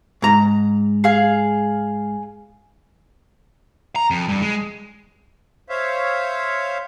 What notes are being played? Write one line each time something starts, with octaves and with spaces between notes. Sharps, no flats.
G#2 A#5
G#4 F5
A#5
F2
G2
G#3
C5 C#5 E5 F5